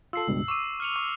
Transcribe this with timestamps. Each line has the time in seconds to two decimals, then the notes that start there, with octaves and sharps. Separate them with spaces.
0.13 F4 A4 E6 C7
0.28 C#2 G2 B2
0.48 C#6 D6 E6 D#7
0.80 F6 C#7 F7
0.96 C#6